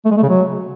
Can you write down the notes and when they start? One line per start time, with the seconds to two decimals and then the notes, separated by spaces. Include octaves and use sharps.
0.05 A3
0.11 G#3
0.17 A3
0.23 C#3
0.29 F#3